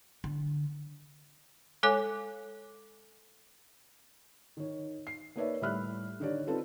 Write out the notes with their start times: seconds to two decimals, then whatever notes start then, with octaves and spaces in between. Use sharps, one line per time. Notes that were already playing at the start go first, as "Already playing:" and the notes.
0.24 D3
1.83 G#3 A4 C#5 G#5 D6
4.57 D#3 C#5
5.07 C7
5.36 A#3 D#4 B4 C#5 D5 E5
5.61 A2 G3 E5 B5 F6 F#6
6.20 D3 D#3 D#4 G4 C#5 D5
6.47 C4 D#4 F4 A4 B4